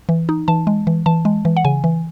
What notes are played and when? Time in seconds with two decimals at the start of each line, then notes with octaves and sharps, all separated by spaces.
0.09 E3
0.29 D#4
0.48 E3 A5
0.67 G#3
0.87 E3
1.06 E3 A5
1.25 G#3
1.45 E3
1.57 F#5
1.65 C#3 G#5
1.84 E3